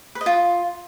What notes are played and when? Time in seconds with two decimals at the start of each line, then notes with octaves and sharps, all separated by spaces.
0.15 B4
0.21 D#5
0.26 F4